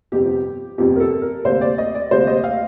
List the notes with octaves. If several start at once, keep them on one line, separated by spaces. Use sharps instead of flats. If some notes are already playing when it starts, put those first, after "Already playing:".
G1 F2 C3 G3 G4
G1 F2 C3 G3 G4
A#4
A4
A#4
D2 C3 G3 A#3 C5
D5
D#5
D5
D2 C3 G3 A#3 C5
D#5
F5